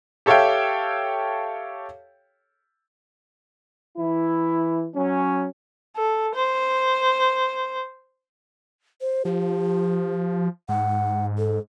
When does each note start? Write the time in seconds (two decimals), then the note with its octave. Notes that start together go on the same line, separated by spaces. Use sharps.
0.26 G4 A4 C#5 E5 F5 G5
3.98 E3 E4
4.95 F#3 C#4
5.96 A4
6.36 C5
9.01 C5
9.25 F3 G4
10.69 G#2 F#5
11.38 A4